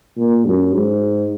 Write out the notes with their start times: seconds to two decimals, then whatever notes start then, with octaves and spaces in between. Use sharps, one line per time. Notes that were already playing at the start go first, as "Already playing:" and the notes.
0.17 A#2
0.46 F#2
0.74 G#2